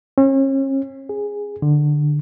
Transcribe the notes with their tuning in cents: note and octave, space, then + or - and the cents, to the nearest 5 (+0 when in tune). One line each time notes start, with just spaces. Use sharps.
C#4 -40
G#4 -10
D3 +15